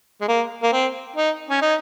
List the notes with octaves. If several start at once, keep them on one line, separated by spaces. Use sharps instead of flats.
G#3
A#3
A#3
C4
D#4
C#4
D#4